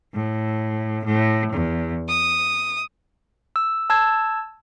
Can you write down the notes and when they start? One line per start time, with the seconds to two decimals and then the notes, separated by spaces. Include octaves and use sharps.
0.14 A2
1.04 A2
1.51 E2
2.08 D#6
3.56 E6
3.90 A5 E6 G#6